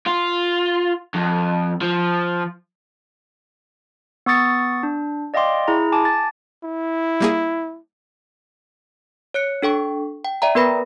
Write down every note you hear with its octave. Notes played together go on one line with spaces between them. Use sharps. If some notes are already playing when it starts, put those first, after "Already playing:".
F4
F2
F3
B3 C#6 D#6 A6 C#7
D4
D5 D#5 F5 G5 C6 D6
E4 G#4 A#5
G#5 A5 D6
A6
E4
G3 A#3 G#4
C#5 F#6 C#7
D4 A4 G5 C#6
G5
D5 E5 G5 A#5
B3 A#4 B4 B5 A#6